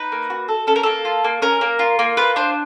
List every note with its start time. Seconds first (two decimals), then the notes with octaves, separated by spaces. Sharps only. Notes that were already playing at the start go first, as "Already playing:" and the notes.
Already playing: D#4 B4
0.12 A#3
0.30 F#4
0.48 A4
0.67 C#4 A4
0.76 A#4
0.83 A#3 A4
1.05 F4
1.24 A#3
1.42 C#4 A#4
1.61 A#3
1.79 F4
1.99 A#3
2.17 F4 B4
2.36 D4 C5